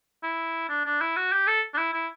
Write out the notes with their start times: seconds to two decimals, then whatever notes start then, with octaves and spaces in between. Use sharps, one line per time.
0.23 E4
0.69 D4
0.86 D4
1.01 E4
1.16 F#4
1.32 G4
1.47 A4
1.74 D4
1.78 E4
1.93 E4